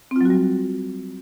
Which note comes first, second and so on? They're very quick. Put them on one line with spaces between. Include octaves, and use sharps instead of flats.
C4 F4 F#3 F#4 G3